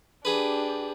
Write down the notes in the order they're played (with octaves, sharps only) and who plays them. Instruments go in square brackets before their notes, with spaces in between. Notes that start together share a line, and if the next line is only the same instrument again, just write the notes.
[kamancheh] D4 G4 [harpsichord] G#4 B4